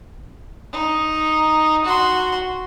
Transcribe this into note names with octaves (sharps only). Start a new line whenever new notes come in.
D#4
F#4 C6